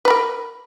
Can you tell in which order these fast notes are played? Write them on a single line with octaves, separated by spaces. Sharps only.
B4 B5 A#4